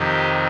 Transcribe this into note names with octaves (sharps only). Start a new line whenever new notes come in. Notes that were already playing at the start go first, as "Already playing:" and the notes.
Already playing: F2 C3 D#3 G4